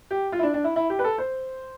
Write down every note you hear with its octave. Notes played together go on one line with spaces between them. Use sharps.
G4
F4
E4
D4
D4
E4
E4
G4
B4
A4
C5